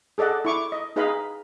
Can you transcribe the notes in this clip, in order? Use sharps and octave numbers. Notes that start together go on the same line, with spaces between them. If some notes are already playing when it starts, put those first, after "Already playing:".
G#4 A4 D5 D#5 F#5
E4 C#6 D6
D#5
D#4 G#4 B4 D#5 F5 B5